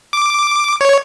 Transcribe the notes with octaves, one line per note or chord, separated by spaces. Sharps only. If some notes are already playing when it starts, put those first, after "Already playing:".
D6
C#5